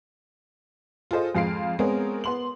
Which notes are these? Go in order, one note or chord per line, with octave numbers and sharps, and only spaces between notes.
F4 G#4 A4 C5 D#5
F2 G#3 F5 C6 C7 D7
G#3 B3 C4 G#4 A#4 C#5
B3 C6 F#7